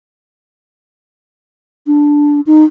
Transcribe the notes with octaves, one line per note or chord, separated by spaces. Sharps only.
D4
D#4